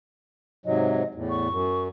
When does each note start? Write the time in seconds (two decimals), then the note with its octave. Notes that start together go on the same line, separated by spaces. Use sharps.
0.66 G#2 C3 F#3 D#5
1.14 E2 A2
1.30 C#6
1.49 F#2